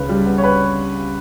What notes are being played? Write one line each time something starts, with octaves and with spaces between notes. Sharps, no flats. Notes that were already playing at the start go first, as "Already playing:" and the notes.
Already playing: C#2 C#3 B4
G3
B3
C#5
B4